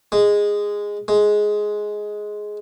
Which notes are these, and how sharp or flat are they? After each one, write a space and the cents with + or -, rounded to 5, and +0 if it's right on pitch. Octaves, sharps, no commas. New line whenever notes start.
G#3 -10
G#3 +10